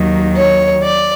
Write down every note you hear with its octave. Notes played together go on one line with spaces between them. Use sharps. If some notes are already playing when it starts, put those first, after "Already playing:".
Already playing: D#2 D#3 F#3
C#5
D5